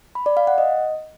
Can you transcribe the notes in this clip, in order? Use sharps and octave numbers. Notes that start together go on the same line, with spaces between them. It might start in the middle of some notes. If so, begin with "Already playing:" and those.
B5
D5
F5
F#5
D#5